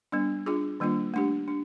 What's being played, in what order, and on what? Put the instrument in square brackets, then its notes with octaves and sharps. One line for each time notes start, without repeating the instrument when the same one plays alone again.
[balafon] G3 B3 D4
D4 F4 G#4
D#3 G3 A#3 D4 F4
A3 D4 G4
D4